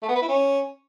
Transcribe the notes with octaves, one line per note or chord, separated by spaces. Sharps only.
A3
B3
B4
E4
C#4